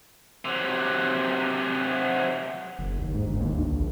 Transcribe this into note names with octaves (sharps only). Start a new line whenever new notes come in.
C3 F#3
F#1
D#2
G#2
G1
D#2
D2
A#1